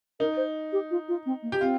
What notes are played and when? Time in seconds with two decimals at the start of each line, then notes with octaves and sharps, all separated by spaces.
0.20 D#4 A#4
0.37 C5
0.73 G4
0.91 F4
1.08 F4
1.26 C4
1.43 A#3
1.52 G4
1.61 C4 F4